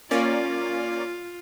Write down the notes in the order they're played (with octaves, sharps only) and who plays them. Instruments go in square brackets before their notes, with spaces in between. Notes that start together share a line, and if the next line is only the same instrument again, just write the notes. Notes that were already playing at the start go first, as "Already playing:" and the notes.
[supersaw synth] A#3 C#4 D5 [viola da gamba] F4